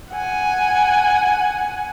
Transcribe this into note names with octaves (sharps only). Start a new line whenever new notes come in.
F#5 G#5